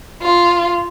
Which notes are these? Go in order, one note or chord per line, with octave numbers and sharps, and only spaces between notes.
F4